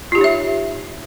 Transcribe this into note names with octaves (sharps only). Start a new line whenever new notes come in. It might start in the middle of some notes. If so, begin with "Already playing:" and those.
D#4 F4 G4 C#5 E5